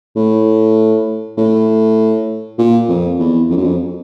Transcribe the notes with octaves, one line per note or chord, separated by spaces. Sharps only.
A2
A2
A#2
F2
E2
F2
F#2
F2